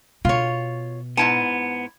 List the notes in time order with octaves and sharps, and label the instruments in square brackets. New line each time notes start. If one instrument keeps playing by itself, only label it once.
[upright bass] B2 [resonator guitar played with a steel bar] F4 C#5
[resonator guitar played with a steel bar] G#2 E4 A5 [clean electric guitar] B3